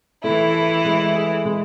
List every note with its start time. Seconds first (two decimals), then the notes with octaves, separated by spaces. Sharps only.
0.24 E3 A3 E4
0.54 A4
0.85 G#3
1.15 G#4
1.45 G#3